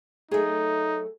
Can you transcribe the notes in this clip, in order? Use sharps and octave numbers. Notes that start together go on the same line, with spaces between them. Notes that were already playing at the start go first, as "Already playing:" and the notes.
F#3 A3 D#4 G#4